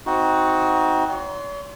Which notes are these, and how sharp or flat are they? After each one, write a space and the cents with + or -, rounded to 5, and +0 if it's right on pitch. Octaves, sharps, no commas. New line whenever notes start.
C4 +0 D#4 +25 F#4 +0
C#5 +45 C6 +0